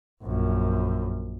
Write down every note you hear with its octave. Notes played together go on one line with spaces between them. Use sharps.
A#1 F#2